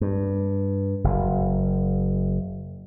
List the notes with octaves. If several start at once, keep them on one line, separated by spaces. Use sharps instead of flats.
G2
F#1